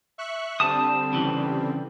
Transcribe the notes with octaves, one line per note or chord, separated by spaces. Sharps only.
E5 C#6 F#6
D3 G3 C4 A5 D#6
C#3 E3